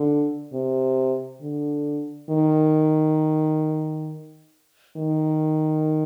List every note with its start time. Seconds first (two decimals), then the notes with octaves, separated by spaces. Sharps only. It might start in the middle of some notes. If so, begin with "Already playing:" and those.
Already playing: D3
0.53 C3
1.42 D3
2.30 D#3
4.97 D#3